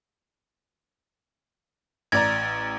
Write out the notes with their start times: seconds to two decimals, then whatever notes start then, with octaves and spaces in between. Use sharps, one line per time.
2.12 A1 D5 A#5 G#6 A6